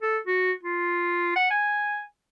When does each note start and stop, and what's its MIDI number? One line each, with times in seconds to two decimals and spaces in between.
0.02 0.18 69
0.27 0.52 66
0.63 1.35 65
1.35 1.46 78
1.51 2.01 80